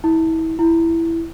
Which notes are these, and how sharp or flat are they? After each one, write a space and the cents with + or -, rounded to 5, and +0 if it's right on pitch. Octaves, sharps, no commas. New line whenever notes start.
E4 -30
E4 +5